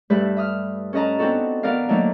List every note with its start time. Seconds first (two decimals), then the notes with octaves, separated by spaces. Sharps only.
0.10 G2 G3 A3 B4 E5
0.37 E5 D#6 F6
0.93 C#4 A4 B4 D#5 A5 A#5
1.19 B3 C4 D4 D#4 F#4 A4
1.63 D#3 B3 A#4 D5 F5
1.89 D3 D#3 F#3 A3 A#3 D#4